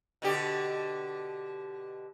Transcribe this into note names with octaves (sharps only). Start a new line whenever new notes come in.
B2 D3 G4